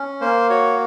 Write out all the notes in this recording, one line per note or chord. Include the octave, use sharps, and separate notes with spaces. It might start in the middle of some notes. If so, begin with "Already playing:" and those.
Already playing: C#4
A#3 C5
F#4 C#5